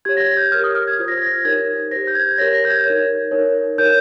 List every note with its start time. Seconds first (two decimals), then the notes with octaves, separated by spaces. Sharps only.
0.05 G4 C#5 G#6
0.17 A#6
0.21 G#6
0.37 G6
0.52 G4 A#4 C#5 F6
0.64 D#6
0.75 F6
0.87 G#6
0.99 F4 C5
1.08 A#6
1.17 G#6
1.26 A#6
1.45 D#4 G4 A#4 C#5 G#6
1.91 G4 C5 A#6
2.07 G6
2.15 G#6
2.31 G#6
2.38 G4 A#4 C#5 A#6
2.54 A#6
2.65 G6
2.70 G#6
2.85 D#4 A#4 C#5
3.31 D#4 A#4 C#5
3.78 D#4 A#4 C#5 G6